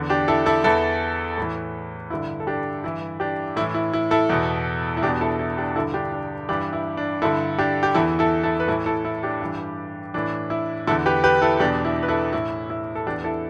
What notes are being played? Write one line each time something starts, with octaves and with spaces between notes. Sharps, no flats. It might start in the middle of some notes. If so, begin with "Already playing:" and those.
Already playing: E2 D3
D4 G4
E4 A4
E4 A4
E2 E3 E4 A4
A2 E3
G2 D3 E4
A4
D4 G4
G2 E3 E4
D4 G4
A2 E3 E4
E4
E4
E4 A4
E2 B2
E4
E2 B2 D4 G4
E4 A4
E4
D4 G4
G2 D3 E4 A4
D4 G4
D4
G2 E3 D4 G4
E4
D4
G2 D3 E4 A4
D4 G4
G4
E2 E3 E4 A4
E4 A4
E4 A4
B4
A2 E3 E4 A4
E4 A4
E4
D4 G4
G2 E3
A2 E3 D4
E4
E2 D3 E4 A4
G4 B4
G4 B4
E4 A4
E2 B2 D4 G4
E4
B4
E4 A4
A2 E3 E4
E4
A4
E2 E3 D4 G4
E4 A4